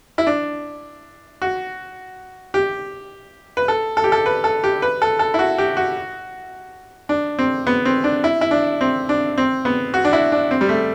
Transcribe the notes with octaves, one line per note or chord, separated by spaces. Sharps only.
E4
D4
F#4
G4
B4
A4
A4
G4
A4
B4
A4
G4
B4
A4
A4
E4
F#4
G4
F#4
D4
C4
B3
C4
D4
E4
E4
D4
C4
D4
C4
B3
F#4
D4
E4
D4
C4
G3
A3